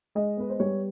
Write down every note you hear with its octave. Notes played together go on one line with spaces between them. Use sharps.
G#3 D#5
B3 B4
C5
G3 C#5